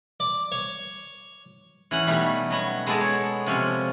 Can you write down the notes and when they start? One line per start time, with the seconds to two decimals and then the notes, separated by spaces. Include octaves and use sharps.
0.20 D5
0.52 C#5
1.91 E3 C#4 F#5
2.07 B2 G3 A3 D#4
2.50 F#3 B3 F#4
2.87 G#3 B3 G#4 A4 D5 A5
3.01 C#5
3.46 C3 F3 B3 C#4